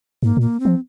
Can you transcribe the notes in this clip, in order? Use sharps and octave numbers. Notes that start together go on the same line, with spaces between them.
G#2 A#3
A#2 A#3
C4
F3